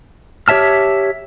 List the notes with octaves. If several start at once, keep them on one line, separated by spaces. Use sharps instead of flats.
G4 C#5 E5 A5 F6